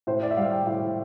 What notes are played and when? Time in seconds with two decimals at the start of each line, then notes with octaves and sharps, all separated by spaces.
0.07 A2 C5
0.23 D5
0.31 E5
0.37 G3 F5
0.51 G5
0.66 A2 F5